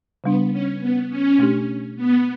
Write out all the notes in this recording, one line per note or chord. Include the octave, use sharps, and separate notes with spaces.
C#3 G3 B3 D4
C#4
B3
C#4
B2 A3 D4 G4
B3